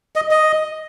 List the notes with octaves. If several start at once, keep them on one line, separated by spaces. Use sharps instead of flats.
D#5
D#5